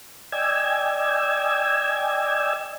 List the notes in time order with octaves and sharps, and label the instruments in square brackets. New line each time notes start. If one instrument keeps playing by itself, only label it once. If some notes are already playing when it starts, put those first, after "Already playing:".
[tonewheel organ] D5 D#5 G5 G#5 E6 G#6